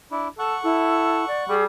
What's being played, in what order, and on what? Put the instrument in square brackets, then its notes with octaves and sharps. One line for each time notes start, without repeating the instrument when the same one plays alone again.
[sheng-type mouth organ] D4 E4
[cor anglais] A4 [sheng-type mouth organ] F#5 C#6
[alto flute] E4 [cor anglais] A4
[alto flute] D5
[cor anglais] G3 [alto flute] G#4